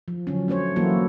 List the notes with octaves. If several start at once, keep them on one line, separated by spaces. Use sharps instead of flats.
F3
D3 F#3 C#4
A3 C#4 C5 C#5
E3 F#3 A#3 E4 F#4 A4